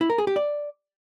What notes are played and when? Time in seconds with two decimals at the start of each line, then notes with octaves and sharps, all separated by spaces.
0.01 E4
0.10 A#4
0.18 G#4
0.27 G4
0.36 D5